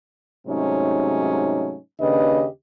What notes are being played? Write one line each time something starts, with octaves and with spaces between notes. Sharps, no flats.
G#2 C3 F#3 A3 C#4 D#4
D#2 C#3 D4 G4 B4 D#5